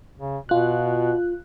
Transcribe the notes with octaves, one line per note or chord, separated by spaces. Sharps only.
C#3
B2 F4 F#6